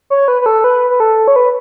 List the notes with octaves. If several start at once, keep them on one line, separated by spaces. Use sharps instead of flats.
C#5
B4
B4
A4
B4
B4
A4
C#5
B4